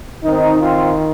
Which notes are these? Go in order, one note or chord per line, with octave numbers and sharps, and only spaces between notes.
D#3 C4 D#4
C4 F4